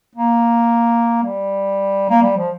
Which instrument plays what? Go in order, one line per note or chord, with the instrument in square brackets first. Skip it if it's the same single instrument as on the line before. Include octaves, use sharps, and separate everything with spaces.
[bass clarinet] A#3
G3
A#3
G3
F3